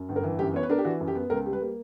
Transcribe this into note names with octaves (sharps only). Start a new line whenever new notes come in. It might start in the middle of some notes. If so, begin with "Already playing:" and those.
Already playing: F#2
G1
A#4
E3
F#2 G4
B3 C#5
B4
D4 A#4
G4
E3 F#4
F#2
G4
B3
C#2 A#4
G3
B4
A#3